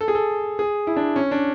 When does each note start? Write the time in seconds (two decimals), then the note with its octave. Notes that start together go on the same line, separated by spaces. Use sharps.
0.01 A4
0.08 G#4
0.15 A4
0.59 G#4
0.87 E4
0.96 D4
1.16 C#4
1.31 D4